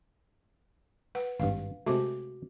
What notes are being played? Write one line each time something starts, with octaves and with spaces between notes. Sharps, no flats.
B4 F#5
G#1 G2 F5
C3 G#3 A3 F#4 D6